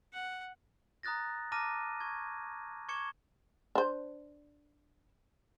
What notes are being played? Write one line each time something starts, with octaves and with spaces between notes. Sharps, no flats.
F#5
A#5 D#6 F#6 A6 A#6
A5 A#5 D6 F6 A#6 D#7
C#6 G#6
C#6 D6 G#6 C#7 E7 G7
D4 C5